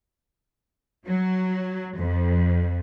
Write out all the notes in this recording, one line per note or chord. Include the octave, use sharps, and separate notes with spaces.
F#3
F2